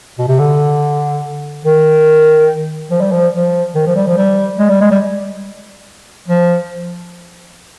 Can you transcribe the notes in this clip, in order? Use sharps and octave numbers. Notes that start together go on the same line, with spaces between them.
B2
C3
D3
D#3
F3
G3
F3
F3
D#3
F3
G3
F3
G3
G#3
G3
G#3
G3
F3